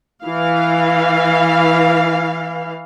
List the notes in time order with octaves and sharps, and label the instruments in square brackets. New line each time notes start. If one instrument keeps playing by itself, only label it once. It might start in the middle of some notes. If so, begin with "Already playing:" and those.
[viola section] E3 F5